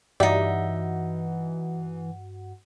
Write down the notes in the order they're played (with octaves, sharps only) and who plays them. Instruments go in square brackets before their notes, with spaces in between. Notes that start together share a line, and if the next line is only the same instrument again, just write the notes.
[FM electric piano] G2 F#4 F#5 [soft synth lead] E3 [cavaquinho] D#4 E5 [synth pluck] G4 D5